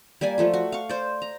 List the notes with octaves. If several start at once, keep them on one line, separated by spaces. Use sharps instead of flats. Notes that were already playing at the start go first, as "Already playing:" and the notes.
G3 A#3 D5 G#5
F3 A3 F4
F#4
F5 C#6
C5 D5
A#5